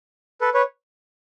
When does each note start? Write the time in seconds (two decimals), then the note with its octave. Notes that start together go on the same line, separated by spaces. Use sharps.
0.41 A4 B4
0.54 B4 C#5